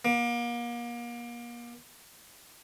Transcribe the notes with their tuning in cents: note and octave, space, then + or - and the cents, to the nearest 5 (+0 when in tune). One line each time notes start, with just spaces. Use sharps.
A#3 +35